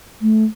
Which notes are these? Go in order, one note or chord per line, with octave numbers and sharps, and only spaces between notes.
A3